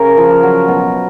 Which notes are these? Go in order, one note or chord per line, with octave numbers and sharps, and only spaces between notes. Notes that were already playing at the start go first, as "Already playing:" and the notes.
Already playing: C#3 A#4
F3
F#3
B2